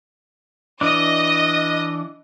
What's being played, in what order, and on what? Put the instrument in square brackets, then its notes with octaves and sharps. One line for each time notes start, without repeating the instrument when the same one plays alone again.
[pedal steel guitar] E3 D4 [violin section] D#5